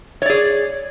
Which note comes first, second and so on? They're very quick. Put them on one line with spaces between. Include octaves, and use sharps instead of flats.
C#5 D5 G#4